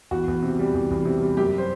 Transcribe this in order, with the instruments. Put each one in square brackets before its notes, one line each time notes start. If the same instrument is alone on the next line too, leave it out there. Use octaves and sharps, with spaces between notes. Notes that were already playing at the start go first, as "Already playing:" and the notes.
[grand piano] E2 F#4
E2
C3
G3
E2
E2
C3
G3
F#2 G4
C5